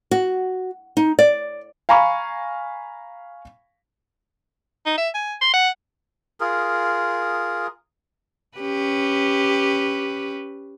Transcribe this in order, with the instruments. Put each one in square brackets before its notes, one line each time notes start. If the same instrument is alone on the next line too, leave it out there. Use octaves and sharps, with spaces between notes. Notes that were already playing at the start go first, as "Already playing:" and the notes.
[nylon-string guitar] F#4
D#4
D5
[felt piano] F5 G#5 A#5 B5 C#6
[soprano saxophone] D#4
E5
G#5
C6
F#5
[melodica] F4 G#4 A#4
[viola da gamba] C#4 G4 B4